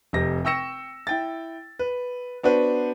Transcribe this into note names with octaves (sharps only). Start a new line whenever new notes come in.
F1 C3 A#6
G5 C#6 E6 A#6 C#7 E7
E4 G5 A6
B4
B3 D4 F#4 B4 C5